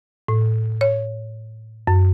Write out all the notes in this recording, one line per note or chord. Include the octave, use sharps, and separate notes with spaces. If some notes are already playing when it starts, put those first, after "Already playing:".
A2
C#5
F#2